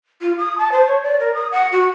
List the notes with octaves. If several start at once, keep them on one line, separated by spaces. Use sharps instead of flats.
F4
D#6
A5
C5
C#5
D5
A#4
D#6
F#5
F#4